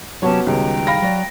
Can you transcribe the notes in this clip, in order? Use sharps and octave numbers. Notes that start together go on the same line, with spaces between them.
C3 F#3 B3 C#4 F#4 G4 C#5 A5
C#2 D#3 G3 G#4 G5 A#5
F5 B5 A#6
F#3 D5